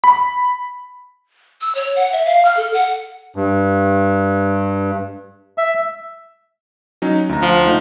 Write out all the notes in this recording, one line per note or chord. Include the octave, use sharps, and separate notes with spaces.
B5
E6
C#5
F#5
E5
F5
F6
A4
F#5
G2
E5
F#3 C#4 D#4
D2 A#5
F3
D3 A3 D#4